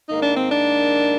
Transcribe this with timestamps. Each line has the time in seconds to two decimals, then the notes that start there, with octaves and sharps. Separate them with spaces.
0.09 G#2 D#3 A#3 D#4
0.23 D4
0.37 C4
0.51 D4